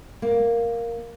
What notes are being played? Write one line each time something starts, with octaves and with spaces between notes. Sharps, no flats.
A#3